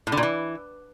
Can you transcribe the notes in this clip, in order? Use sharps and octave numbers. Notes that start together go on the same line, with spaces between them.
A2
D3
A#2
E3